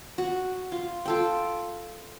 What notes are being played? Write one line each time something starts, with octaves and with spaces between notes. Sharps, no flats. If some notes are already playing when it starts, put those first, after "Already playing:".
F#4
F4
F4 A4 G5